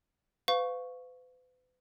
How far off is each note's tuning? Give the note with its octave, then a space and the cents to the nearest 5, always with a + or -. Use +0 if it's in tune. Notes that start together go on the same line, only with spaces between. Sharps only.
B4 +40 F5 +10 C#6 +0